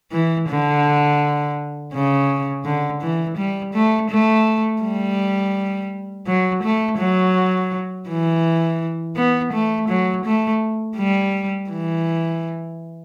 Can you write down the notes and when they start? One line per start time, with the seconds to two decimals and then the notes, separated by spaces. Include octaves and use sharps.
0.12 E3
0.49 D3
1.94 C#3
2.65 D3
3.02 E3
3.37 G3
3.74 A3
4.10 A3
4.83 G3
6.27 F#3
6.64 A3
6.99 F#3
8.09 E3
9.16 B3
9.53 A3
9.89 F#3
10.25 A3
10.97 G3
11.70 E3